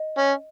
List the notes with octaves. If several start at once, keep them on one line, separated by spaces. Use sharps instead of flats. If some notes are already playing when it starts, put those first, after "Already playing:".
Already playing: D#5
C#4